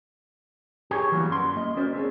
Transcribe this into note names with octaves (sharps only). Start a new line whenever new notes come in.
G4 G#4 C#5
E3 F#3 G3 A#3 B3
F#2 C6
A#3 D#5
C#4 F#4 A#4 C5 D5
C4 D4 G#4 C#5